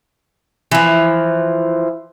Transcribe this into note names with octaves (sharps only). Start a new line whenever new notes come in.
E3 F3